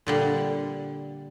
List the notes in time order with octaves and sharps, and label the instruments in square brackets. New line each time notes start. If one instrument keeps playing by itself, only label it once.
[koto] A#2 D3 G3